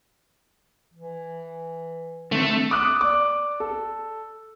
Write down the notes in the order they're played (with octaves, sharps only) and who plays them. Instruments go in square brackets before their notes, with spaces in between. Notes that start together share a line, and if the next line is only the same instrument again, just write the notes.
[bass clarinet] E3
[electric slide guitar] D3 D#3 C4 [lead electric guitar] A3
[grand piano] D6 D#6 F#6
D5 D6
A4